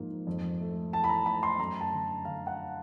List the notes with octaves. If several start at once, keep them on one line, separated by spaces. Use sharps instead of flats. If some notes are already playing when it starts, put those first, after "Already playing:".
Already playing: G#2 F3 A#3
F2
A3
E3 A5
B5
A#5
A3 B5
C6
F#2 A#5
A5
D3
D3 F5
F#5